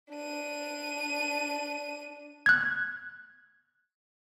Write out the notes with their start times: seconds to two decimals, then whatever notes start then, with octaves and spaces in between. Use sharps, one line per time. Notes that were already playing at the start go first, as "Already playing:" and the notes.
0.12 D4 D#7
2.46 F#6 G#6